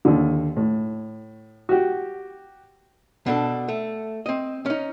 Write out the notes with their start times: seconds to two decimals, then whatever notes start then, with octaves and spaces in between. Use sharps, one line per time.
0.05 D#2 D3
0.57 A2
1.69 F#4 G4
3.26 B2 D4 A4
3.68 A3
4.26 C4 D#5
4.66 C#4 D#4